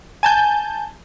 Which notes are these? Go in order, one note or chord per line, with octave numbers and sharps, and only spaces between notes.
G#5 A5 G6